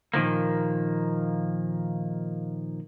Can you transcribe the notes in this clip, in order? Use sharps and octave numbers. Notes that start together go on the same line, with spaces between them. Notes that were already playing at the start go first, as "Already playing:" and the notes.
A#2 D#3 F3 A#3